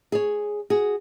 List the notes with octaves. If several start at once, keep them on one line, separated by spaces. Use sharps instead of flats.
G#4 C#5
F#4 G#4